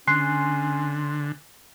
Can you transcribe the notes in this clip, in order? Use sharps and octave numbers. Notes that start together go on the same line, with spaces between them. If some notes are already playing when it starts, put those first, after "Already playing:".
D3 C#4 G#5 C6 F#6 C7